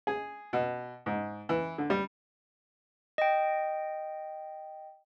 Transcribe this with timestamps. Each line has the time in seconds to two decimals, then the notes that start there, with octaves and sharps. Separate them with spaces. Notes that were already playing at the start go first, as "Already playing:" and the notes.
0.07 G#4
0.53 B2
1.06 G#2
1.49 E3
1.78 D3
1.90 G3
3.18 D#5 G5